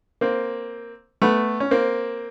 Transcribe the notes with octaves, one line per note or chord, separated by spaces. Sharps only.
A#3 C4
A3 B3
C#4
A#3 C4